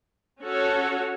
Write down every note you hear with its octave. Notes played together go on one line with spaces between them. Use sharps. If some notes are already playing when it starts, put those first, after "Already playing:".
C#4 F#4 A4 C#5